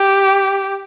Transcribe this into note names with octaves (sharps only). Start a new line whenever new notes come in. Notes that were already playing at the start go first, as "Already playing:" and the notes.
Already playing: G4